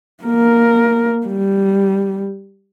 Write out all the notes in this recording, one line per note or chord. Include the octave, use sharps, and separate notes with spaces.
A#3 A#4
G3